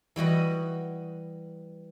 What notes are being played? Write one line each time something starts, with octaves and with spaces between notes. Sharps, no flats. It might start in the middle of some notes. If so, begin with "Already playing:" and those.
E3 G3 F#4 D#5